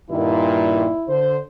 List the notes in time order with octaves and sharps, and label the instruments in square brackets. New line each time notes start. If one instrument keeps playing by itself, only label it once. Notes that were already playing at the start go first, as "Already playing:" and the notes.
[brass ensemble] G2 A#2 D#3 [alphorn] E4
[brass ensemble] D3 C5